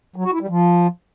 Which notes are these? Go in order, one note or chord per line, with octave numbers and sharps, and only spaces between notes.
F#3
F#4
E4
G3
F3